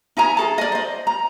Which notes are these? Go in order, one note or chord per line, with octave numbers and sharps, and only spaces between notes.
D#4 E5 G#5 A#5
G#4 A4 A5
D5 D#5
C5 D#5
A#5